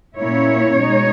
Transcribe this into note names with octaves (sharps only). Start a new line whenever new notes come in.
A#2 A#3 C#4 E4 C#5
B2 G#3 D#4